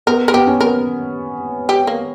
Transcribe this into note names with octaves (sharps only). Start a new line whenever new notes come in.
B3 A#4
A#4
B3 G4
C#4
B3 A#4
G4
A#3